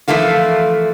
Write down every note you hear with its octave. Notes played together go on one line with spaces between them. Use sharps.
E3 F3 A3 A#3 F4